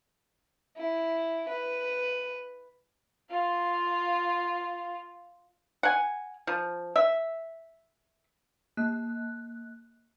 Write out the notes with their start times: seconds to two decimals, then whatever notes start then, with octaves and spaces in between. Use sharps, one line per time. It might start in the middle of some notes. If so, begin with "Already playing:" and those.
0.77 E4
1.49 B4
3.31 F4 F5
5.83 F#5 G#5
6.47 F3
6.96 E5
8.77 A#3 F#6